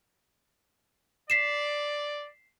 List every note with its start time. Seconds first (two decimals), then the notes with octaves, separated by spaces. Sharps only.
1.30 D5 B6 C7 E7